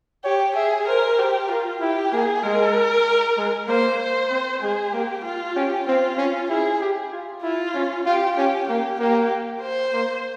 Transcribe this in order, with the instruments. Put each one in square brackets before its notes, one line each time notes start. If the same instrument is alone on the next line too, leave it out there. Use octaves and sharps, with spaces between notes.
[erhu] G4 [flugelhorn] C#5
[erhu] G#4 [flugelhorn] E5
[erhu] A#4 [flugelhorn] C5
[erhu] G4 [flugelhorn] C5
[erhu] F4 [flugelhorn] A#4
[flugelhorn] E4 [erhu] G4
[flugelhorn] A#3 [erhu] G#4
[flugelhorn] G#3 [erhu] A#4
[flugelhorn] G#3
[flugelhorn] A#3 [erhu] C5
[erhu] C5
[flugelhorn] C4
[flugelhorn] G#3 [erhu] G#4
[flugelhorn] A#3 [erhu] G4
[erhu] F4
[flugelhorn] C#4 [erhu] G4
[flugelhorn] C4 [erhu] F4
[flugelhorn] C#4
[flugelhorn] E4 [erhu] G#4
[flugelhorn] G4
F4
[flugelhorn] E4 [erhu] F4
[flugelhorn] C#4
[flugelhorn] F4 [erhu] G4
[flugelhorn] C#4 [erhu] G4
[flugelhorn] A#3 [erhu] G4
[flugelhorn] A#3 [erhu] G4
[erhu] C5
[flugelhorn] A#3